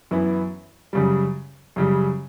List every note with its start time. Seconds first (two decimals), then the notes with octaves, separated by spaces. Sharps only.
0.11 F#2 E3 B3 E4
0.93 F#2 C#3 G3
1.76 F#2 C#3 G3